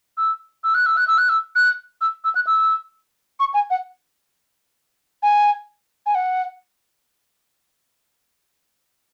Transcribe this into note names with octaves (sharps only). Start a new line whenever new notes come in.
E6
E6
F#6
E6
F#6
E6
F#6
E6
F#6
E6
E6
F#6
E6
C#6
G#5
F#5
G#5
G#5
F#5